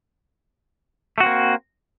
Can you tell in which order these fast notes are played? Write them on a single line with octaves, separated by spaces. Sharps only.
A3 F#4 C4 A#3